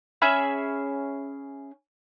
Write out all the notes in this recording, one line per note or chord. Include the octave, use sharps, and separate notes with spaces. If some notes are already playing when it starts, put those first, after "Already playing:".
C#4 G#4 E5 B5